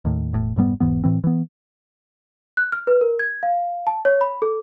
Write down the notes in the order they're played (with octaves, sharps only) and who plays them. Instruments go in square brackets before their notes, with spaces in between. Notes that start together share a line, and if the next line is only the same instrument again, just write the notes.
[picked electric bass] D#2 A2
E1 A2
F1 G#2 G3 B3
E1 G#2 E3 B3
A2 E3 C4
E3 B3
[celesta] F#6
F6
B4
A#4
G#6
F5
A5
C#5
B5
A4